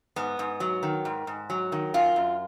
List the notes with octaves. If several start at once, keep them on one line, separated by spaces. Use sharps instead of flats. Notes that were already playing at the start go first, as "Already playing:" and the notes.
G#2 B3
G#2
F#3
D#3
G#2
G#2
F#3
D#3
F#2 F4
F#2